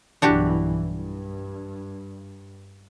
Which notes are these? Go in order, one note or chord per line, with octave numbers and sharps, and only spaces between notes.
B1 G2 E3 D4 F#4 G4
G2